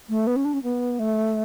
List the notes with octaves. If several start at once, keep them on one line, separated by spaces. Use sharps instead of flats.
A3
B3
C#4
D4
C#4
B3
A3